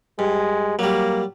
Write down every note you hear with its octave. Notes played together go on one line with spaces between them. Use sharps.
G2 G#3
F#3 G3 A#3